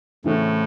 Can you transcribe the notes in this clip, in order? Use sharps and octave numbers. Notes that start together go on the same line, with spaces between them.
A2 C#3 E3 C4 F#4 A4